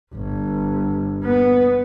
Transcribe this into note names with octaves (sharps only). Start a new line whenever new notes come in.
G1
B3